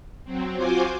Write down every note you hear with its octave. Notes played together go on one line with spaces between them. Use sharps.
F#3 C4
F4 F#4 C5 G#5 C6 D6